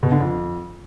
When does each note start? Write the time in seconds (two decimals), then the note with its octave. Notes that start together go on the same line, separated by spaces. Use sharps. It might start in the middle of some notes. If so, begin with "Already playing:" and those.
0.03 B2
0.12 D3
0.21 F2